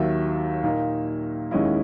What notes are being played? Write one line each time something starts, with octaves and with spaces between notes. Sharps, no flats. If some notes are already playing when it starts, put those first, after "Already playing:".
Already playing: D#2 D#3 F#3 E5
A#2 A#3 D#4
D#2 D#3 G#3 C#4 E4 D#5